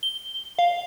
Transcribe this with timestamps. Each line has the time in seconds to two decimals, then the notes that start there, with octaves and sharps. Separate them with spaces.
0.03 G7
0.59 F5